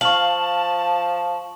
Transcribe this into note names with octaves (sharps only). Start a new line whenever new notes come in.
F3 F5 A5 C#6 F#7